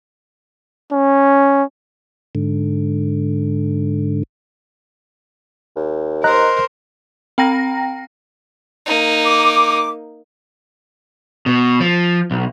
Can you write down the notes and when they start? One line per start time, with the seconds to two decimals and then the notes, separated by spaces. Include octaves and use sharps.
0.92 C#4
2.35 G#2 D3
5.76 D#2
6.24 A#4 C5 D#5 A#5 F#6
7.38 C4 G5 A#5 A#6
8.86 A#3 D#4
9.25 D6
11.46 B2
11.80 F3
12.31 B1